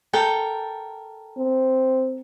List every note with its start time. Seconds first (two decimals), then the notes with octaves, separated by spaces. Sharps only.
0.13 A4 A#4 G5
1.37 C4